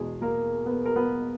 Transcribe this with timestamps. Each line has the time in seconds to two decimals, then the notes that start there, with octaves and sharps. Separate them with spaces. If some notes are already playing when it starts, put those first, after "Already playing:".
Already playing: E2 B2 G#3 G#4
0.21 A#3 A#4
0.66 B3 B4
0.86 A#4
0.96 B3 B4